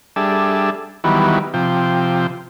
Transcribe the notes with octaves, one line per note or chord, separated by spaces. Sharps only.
G3 D4 G#4 A4 E5
D#3 E3 F#3 G3 B3
C3 F3 G5